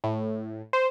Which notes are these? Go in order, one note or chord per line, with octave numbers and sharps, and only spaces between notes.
A2
C5